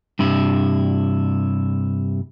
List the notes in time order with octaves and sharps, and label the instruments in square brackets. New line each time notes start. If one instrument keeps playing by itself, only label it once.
[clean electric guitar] G2 C3 E4